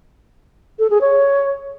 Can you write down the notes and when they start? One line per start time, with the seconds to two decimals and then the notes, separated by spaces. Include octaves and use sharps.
0.79 A4
0.90 G#4
1.01 C#5